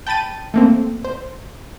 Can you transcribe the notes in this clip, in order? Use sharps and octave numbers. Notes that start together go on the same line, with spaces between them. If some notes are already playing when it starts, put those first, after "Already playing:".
G5 A5 B5 A6 D#7
A3 A#3 C4
C5